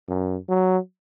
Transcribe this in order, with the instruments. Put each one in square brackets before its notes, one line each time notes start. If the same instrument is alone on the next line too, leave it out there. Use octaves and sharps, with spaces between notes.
[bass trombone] F#2
F#3